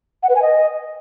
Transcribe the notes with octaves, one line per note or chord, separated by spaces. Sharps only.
F#5
B4
G#5
D#5